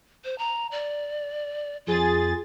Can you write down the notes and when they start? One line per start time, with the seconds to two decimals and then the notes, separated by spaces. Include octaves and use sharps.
0.25 C5
0.39 A#5
0.72 D5
1.87 F2 F4 G#4 A6